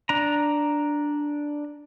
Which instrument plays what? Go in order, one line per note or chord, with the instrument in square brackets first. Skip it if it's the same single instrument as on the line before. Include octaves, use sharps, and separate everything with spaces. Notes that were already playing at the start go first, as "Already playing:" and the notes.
[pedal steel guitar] D4 A#5